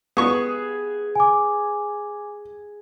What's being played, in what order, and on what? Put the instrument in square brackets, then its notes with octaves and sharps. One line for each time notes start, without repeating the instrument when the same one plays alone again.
[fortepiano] B3 C#6 [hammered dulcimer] G#4
[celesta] G#5 D6